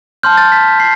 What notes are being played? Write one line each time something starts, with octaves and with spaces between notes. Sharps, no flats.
A5 C6 F6 G6
A6
B6
C6 C7